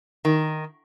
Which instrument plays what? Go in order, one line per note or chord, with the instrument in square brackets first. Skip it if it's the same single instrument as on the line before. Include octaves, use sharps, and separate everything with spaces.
[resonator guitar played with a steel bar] D#3